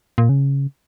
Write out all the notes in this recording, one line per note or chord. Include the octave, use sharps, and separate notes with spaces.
A#2
C#3